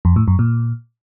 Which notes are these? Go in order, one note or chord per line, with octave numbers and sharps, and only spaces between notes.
F2
A2
F#2
A#2